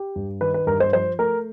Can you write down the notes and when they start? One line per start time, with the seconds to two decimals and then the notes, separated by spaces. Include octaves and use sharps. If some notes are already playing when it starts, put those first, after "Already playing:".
Already playing: G4
0.16 G2
0.41 D#3 B4
0.54 B4
0.66 G2 A#4
0.80 C5
0.93 F3 C5
1.19 A3 A#4